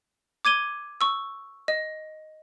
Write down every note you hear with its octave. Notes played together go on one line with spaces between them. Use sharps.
D6 G#6 D#7 G7
C#6 E6
D#5